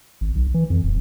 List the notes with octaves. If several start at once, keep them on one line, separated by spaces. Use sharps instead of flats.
G#1
B1
E3
F2
D#1